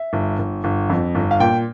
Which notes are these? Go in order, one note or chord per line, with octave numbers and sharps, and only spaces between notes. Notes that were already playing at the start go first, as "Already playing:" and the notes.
Already playing: E5
G1
G1
G1
F2
G1
F5
A#2 G5